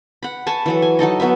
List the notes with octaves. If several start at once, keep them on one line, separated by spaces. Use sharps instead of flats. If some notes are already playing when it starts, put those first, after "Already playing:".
F#5 B5
G#5 A5 B5 C#6
E3 F#3 A4
G#5
F#3 D#4 A4 D#5
F#3 B3 B4 E5